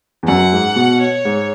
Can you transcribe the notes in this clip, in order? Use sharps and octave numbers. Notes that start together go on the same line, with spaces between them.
E2
F#2 F#5
G#2
B2
C#5
G#2